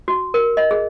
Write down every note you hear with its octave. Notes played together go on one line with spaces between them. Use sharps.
F#4
A#4
D#5
G#4